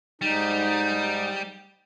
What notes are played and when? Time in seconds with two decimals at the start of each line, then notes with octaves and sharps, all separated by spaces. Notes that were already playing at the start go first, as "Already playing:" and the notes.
0.22 G#2 G3 D#4